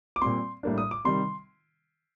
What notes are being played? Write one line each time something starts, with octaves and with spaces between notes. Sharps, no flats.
D6
A#2 G3 C4 C6
A2 G3 A#3 D4
D#6
D6
C3 D#3 G3 C6